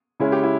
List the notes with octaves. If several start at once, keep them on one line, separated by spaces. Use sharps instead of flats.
C#3 G#3 C#4 E4
G4
E4